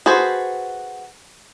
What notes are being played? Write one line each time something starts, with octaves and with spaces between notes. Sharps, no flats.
F#4 G#4 A4 B4 C5